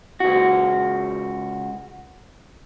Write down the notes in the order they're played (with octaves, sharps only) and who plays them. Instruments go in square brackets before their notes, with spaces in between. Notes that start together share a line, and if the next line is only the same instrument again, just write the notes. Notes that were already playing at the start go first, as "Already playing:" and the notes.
[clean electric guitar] C#2 F#4